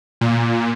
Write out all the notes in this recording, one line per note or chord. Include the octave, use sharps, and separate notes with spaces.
A#2